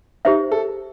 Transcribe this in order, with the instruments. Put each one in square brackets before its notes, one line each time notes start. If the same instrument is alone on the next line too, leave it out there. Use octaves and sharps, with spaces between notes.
[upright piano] D#4 [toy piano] G4 C5 E5
[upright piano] A4